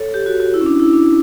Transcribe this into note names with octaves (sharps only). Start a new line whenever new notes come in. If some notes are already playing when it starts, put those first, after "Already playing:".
Already playing: A4 C#5
G4
F#4
F#4
E4
C#4
D4
E4
D4